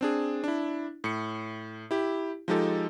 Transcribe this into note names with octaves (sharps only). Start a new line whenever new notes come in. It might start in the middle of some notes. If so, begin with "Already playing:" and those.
C4 D4 G#4
D4 E4
A2 C#7
E4 G4
F3 G#3 D#4 G4 A4